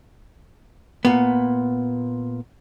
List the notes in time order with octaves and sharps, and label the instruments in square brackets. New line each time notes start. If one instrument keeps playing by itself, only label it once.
[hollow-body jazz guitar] A#2 B3